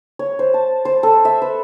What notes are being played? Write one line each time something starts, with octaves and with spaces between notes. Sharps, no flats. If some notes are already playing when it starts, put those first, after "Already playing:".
C#5
C5
A5
C5
A4
E5
B4